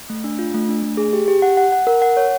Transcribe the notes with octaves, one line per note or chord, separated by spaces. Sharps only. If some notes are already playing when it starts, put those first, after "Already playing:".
A3
D4
F4
A3
D4
A3
G#4
G4
G4
F#5
F#5
F#5
A#4
F#5
C#5